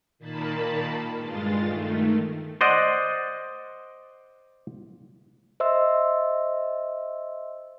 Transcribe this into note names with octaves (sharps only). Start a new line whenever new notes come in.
A#2 D#3 A#3 A5 B5
G2 G#3 F4 A6
D#3 A3
C5 D5 D#5 F#5
C5 D#5 E5 C6 E6